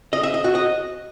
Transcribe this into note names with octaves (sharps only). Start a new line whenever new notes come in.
D#5
E5
D#5
F#4
D#5